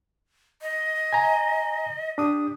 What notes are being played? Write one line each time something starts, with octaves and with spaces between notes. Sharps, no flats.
D#5
G#5 A#5
D4 G4 D#6